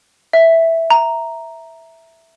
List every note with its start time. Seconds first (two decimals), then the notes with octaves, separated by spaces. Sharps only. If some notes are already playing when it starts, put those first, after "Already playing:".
0.33 E5
0.91 A#5